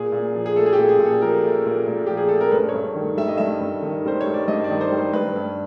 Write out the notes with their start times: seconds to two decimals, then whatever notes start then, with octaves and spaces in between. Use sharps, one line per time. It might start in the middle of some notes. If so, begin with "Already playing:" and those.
Already playing: A#2 G#4
0.12 A#2
0.35 F3
0.46 G#4
0.56 A3 A4
0.66 G#4
0.73 G4
0.78 A#2
0.89 G#4
0.99 A#2
1.06 A4
1.22 F3 A#4
1.44 A3
1.65 A#2
1.87 A#2
2.07 F3 G4
2.17 G#4
2.28 A3 A4
2.41 A#4
2.52 G2 B4
2.69 C#5
2.74 G2
2.95 D#3
3.17 G3 E5
3.28 D#5
3.37 G2 E5
3.61 G2
3.82 D#3
4.05 G3 C5
4.21 C#5
4.27 G2
4.34 D5
4.48 G2 D#5
4.64 D5
4.70 D#3
4.81 C5
4.92 G3
4.98 C5
5.13 G2 B4
5.36 G2